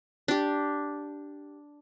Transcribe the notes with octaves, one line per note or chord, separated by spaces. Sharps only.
D4 G4